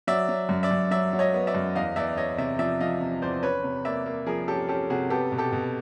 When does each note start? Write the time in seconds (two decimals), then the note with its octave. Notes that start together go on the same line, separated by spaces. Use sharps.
0.07 F#3 D5 E5
0.29 F#3
0.49 F#2
0.63 D5 E5
0.71 F#2
0.91 F#3 D5 E5
1.13 F#3
1.19 C#5 D#5
1.34 B3
1.47 D5 E5
1.55 F#2
1.75 E2 D#5 F5
1.96 E2 D5 E5
2.17 E2 C#5 D#5
2.38 C3 D5 E5
2.59 F3 D5 E5
2.80 F3 D#5 F5
3.01 C3
3.22 E2 C5 D5
3.43 C#4 B4 C#5
3.64 C3
3.85 A#3 D5 E5
4.06 A#3
4.26 F3 G#4 A#4
4.48 C#4 G4 A4
4.69 C#4 G4 A4
4.90 C3 F#4 G#4
5.10 B3 G4 A4
5.32 B2
5.38 G4 A4
5.52 B2